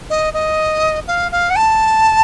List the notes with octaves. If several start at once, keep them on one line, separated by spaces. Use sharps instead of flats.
D#5
D#5
F5
F5
F#5
A5